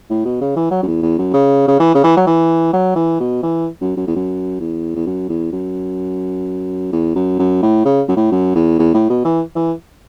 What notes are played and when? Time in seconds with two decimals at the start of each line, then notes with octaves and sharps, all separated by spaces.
0.10 A2
0.25 B2
0.41 C#3
0.56 E3
0.71 F#3
0.83 F#2
0.87 E2
1.02 E2
1.18 F#2
1.34 C#3
1.68 C#3
1.80 E3
1.95 C#3
2.04 E3
2.17 F#3
2.27 E3
2.73 F#3
2.96 E3
3.20 B2
3.43 E3
3.81 F#2
3.97 F#2
4.07 E2
4.16 F#2
4.60 E2
4.95 E2
5.06 F#2
5.29 E2
5.52 F#2
6.92 E2
7.15 F#2
7.39 F#2
7.63 A2
7.85 C#3
8.08 F#2
8.16 A2
8.31 F#2
8.55 E2
8.79 E2
8.94 A2
9.10 B2
9.25 E3
9.56 E3